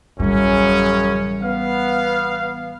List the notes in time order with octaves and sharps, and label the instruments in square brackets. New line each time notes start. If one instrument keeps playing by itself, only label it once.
[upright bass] A1 G3 [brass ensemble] F#2 C#3 C#4
[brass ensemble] B3 F5